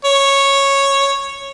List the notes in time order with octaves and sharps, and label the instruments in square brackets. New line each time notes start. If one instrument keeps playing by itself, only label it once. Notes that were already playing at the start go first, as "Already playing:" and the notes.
[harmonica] C#5